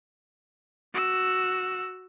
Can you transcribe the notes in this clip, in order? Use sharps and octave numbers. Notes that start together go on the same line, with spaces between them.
F#4 E6